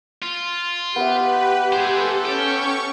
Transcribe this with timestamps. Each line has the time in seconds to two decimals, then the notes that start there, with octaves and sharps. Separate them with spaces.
0.22 F4
0.96 B3 G4 B4 E5
1.72 G#4 A4 C5
2.25 C#4 G4 C#6